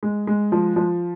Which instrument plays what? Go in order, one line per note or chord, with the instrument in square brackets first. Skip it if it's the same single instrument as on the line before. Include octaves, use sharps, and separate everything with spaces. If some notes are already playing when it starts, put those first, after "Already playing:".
[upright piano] G#3
G#3
F3
F3